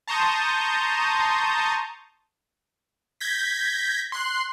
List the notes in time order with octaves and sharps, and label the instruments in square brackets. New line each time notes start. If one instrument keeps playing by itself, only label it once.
[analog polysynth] A5 A#5 C6 C#6 D#6 G6
G6 G#6 A#6 B6
C6 F#6 C7